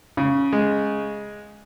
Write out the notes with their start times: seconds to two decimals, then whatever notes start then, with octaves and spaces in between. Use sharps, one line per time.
0.17 C#3
0.53 G#3